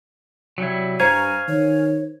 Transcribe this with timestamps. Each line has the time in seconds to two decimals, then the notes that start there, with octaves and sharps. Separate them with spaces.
0.58 C3 F#3 G3 E4
1.00 G2 C5 F5 G#5 A#5 C#6 G#6
1.48 D#3 C#5